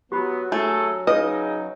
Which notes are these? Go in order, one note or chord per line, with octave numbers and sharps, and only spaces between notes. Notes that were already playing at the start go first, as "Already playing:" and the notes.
F#3 B3 G4 B5
A3 D4 G#4 A4
C#3 D#4 B4 D#5